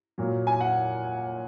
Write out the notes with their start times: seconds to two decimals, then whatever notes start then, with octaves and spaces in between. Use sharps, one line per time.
0.18 A#2 F#3
0.47 G#5
0.61 F#5